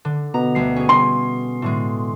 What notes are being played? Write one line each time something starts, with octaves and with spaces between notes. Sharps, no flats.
D3
B2 B3 A#5
D2 G3 C7
C#4 G#4
C6
A2 D3 G#3